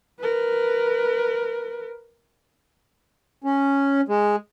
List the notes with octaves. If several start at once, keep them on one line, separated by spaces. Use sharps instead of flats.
A#4 B4
C#4
G#3